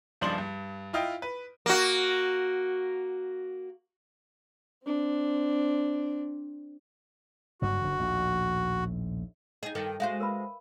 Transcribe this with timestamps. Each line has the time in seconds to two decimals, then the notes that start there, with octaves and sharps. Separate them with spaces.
0.21 C#2 G2 F3 D4 C6 F#7
0.38 G2
0.93 E4 F4 D#5 G5
1.22 B4
1.66 A#3 F#4
4.85 C4 D4
7.62 F#1 G2 A#3 F#4
7.82 F#1 D3
8.00 A#1 D#2 A2
9.63 D#4 G#4 D#5
9.75 G2 D#3 A4
10.00 G#3 F#4 C5 E5 F5
10.20 A#4 B4 B5